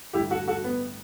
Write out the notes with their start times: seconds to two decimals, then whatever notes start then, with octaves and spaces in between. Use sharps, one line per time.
0.13 A1 G2 D3 E4 G4
0.30 F#4 A4
0.47 F#4 A4
0.64 B3